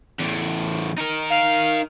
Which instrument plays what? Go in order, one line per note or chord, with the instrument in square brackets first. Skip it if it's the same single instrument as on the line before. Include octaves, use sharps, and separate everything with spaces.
[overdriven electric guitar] E2 A2
D#4 A#4
[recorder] F5